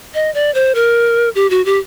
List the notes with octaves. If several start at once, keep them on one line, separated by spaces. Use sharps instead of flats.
D#5
D5
C5
A#4
G4
F#4
G4